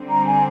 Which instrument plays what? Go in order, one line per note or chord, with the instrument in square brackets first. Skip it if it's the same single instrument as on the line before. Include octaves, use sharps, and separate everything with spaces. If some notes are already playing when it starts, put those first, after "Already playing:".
Already playing: [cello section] D3 G3 C4
[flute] A#5
G#5